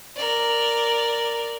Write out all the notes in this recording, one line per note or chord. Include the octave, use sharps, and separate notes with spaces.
A#4 D5